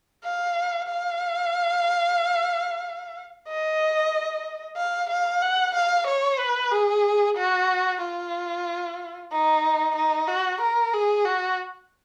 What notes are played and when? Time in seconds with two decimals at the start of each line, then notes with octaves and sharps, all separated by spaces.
0.24 F5
0.88 F5
3.48 D#5
4.77 F5
5.10 F5
5.42 F#5
5.75 F5
6.08 C#5
6.39 B4
6.72 G#4
7.37 F#4
8.01 F4
9.32 D#4
9.95 D#4
10.28 F#4
10.61 A#4
10.93 G#4
11.25 F#4